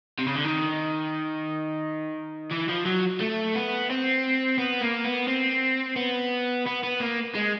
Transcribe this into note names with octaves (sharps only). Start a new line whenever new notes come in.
C3
C#3
D3
D#3
E3
F3
F#3
A3
B3
C4
B3
A#3
B3
C4
B3
B3
B3
A#3
G#3